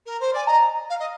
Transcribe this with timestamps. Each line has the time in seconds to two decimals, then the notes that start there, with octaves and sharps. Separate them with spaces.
0.06 A#4
0.20 C5
0.33 D5 G#5
0.47 D#5 A#5
0.89 F5
0.99 D#5